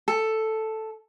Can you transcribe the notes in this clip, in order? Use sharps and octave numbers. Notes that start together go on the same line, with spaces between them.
A4